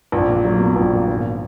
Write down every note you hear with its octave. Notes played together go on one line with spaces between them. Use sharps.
A#1
A#2
F#3
B3
A#1
A#2
G#1